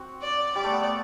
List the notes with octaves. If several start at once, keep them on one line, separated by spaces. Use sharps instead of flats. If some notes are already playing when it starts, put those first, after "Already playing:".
Already playing: C4 F#4
D5
G3 D5
A3
B3
A3